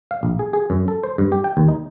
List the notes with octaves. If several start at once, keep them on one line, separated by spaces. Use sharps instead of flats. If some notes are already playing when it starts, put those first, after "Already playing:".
F5
A#1
G#4
G#4
F#2
A4
C5
G2
G4
G5
D#2
D#4